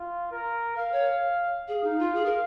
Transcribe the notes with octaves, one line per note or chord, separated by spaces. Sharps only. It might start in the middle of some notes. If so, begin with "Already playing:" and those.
Already playing: F4
A#4
A#4 F5
C#5
G#4 F5
D#4
F4
G#4
A#4